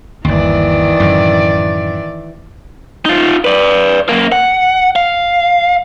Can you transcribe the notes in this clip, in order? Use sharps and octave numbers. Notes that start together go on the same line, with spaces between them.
G1 D#2 D#3 E3 D5
F#2 A2 D3
D#4 F4
B4 D5
F#2 A#3
F#5
F5